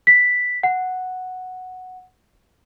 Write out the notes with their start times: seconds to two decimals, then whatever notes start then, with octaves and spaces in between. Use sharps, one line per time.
0.07 B6
0.63 F#5